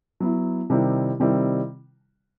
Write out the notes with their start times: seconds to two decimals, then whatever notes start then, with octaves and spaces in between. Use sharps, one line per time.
0.20 F#3 B3 E4
0.70 C3 D#3 G3 C4 E4
1.20 C3 D#3 G3 C4 E4